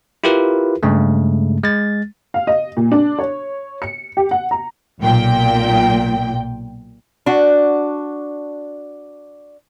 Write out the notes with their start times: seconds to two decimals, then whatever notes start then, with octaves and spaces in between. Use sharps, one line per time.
0.24 E4 F4 G4 A#4 B4
0.83 G2 C#3 G#3 A3
1.63 G#3 A6
2.34 F5
2.47 D#5
2.77 A#2
2.92 D4
3.19 C#5
3.82 C#7
4.17 G4
4.31 F#5
4.51 A#5
5.01 B1 A#2 G5
7.26 D4 F#4